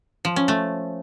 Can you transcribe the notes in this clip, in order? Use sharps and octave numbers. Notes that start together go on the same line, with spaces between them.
F3
C#4
A3